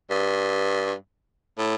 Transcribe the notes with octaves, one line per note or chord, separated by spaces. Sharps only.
G2
A2